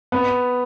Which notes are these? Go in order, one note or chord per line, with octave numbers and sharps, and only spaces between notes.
B3